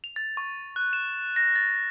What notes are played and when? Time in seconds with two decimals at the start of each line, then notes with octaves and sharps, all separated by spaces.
0.04 F7
0.16 A6
0.37 C#6
0.76 F#6
0.93 E7
1.36 A#6
1.56 A6